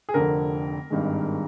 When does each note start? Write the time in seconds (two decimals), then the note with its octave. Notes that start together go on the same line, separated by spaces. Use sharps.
0.09 G#4
0.14 F1 F2 D3 A#4
0.90 G#1 G2 D#3 G#3